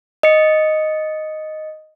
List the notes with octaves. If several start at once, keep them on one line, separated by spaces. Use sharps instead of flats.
D#5 C#7